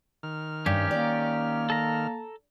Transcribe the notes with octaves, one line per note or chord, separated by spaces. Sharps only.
D#3 F6
G2 C#4 G4
A#3 D5
A4 A#5